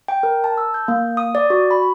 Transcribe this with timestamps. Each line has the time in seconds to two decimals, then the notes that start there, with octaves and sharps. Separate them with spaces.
0.08 G5
0.23 A#4
0.44 A5
0.58 E6
0.74 G6
0.88 A#3
1.17 D#6
1.35 D5
1.50 F#4
1.71 B5